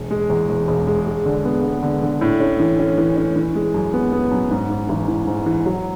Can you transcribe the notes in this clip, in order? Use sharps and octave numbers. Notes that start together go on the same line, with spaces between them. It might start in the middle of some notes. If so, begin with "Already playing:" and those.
Already playing: E1
G#3
E2
E1
E1
G#3
G#3
D3
B3
B3
D3
D3
A2
C#4
E3
C#4
E3
C#4
E3
G#3
F#2
B3
B3
F#2
G#2
G#2
A1
E3
G#2
E3
F#3